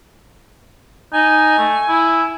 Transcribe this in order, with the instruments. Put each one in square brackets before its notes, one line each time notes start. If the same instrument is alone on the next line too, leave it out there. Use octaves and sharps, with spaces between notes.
[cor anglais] D#4 [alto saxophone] G#5
[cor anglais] A3
E4